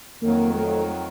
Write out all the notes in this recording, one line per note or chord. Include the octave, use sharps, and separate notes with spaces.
F2 D#3 F#3 A#3
A3